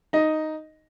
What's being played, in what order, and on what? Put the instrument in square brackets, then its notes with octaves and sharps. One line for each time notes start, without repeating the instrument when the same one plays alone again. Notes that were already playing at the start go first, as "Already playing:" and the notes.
[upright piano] D#4 D#5